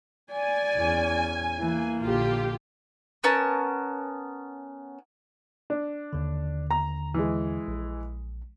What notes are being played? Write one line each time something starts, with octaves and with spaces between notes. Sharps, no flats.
D5 G#5
E2 C#4
E3 A#3
A#1 D3 F4 G4
B3 C#4 A#4 A5
D4
D#2 D3
A#5
E3 G#3
A#1